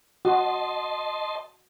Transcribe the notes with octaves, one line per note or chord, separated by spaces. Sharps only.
F#4 D#5 A5 C6